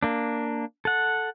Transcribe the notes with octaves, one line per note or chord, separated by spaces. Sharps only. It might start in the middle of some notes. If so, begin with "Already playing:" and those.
A#3 D4
A4 F#5